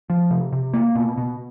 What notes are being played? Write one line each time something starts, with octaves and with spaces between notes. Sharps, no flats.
F3
C3
C3
A#3
B2
B2